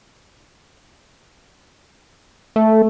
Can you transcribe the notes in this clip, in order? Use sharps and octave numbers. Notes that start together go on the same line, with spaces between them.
A3